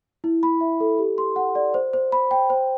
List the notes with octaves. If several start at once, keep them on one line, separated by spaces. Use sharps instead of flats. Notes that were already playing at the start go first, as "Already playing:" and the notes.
E4
B5
E5
A4
G4
C6
F#5
D5
C5
C5
B5
G5
C5